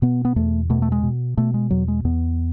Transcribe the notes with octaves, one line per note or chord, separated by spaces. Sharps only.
B2 B3
B3
E2 A3
B2 A3
A3
G#3
B2
B2 A3
G#3
E2 F#3
G#3
E2 B3